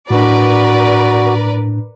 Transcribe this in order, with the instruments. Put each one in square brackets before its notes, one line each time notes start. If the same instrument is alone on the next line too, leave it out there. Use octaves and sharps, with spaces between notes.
[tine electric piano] A2 D4 [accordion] F#4 [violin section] A#4 B4 D5